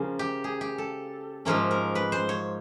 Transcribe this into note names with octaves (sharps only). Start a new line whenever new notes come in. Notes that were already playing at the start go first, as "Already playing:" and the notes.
Already playing: C#3 F3 A#3 C#4
G4
G#4
G4
A4
G#2 F3 A#3 C#4 A#4
A#4
B4
C5
C#5